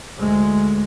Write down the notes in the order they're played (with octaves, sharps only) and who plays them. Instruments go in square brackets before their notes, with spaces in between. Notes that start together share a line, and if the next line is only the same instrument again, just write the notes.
[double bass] D2 G#3